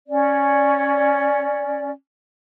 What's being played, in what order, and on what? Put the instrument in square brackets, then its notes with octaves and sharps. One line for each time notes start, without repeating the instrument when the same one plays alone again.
[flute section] C#4 D5